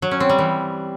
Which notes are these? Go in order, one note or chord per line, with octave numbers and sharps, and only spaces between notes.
F#3
C#4
C4
G3
E3